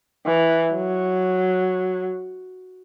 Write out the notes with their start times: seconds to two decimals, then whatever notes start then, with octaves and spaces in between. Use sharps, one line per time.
0.26 E3
0.72 F#3